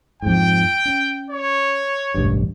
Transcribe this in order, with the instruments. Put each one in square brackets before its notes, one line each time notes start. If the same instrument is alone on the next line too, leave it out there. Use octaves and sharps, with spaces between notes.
[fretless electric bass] F2 G#2 [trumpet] G5
[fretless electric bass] C#4
[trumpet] C#5
[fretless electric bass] E1 A1 G2